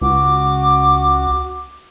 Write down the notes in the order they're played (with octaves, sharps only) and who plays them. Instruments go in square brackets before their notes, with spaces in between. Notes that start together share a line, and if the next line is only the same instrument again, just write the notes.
[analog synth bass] C#2 [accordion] F#4 [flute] D6